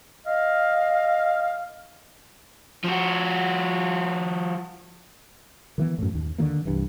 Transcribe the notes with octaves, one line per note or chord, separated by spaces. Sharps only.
D#5 F5
F3 F#4
D#3 E3 B3
F#2 A2
D#2
D3 D#3 F3 A#3
C2 G2 E3